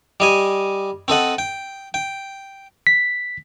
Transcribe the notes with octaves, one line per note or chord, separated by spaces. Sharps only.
G3 D#5 G#5
C4 A4 D#5 F#5
G5
G5
B6